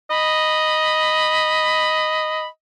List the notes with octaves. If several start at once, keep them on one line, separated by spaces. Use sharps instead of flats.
D#5 B5